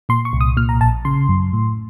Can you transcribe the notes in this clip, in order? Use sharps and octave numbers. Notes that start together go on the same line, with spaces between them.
A#2 C6
C#6
C2
D#6
A#2 F6
A#5
A#1 A5
C#3 C6
F#2
A2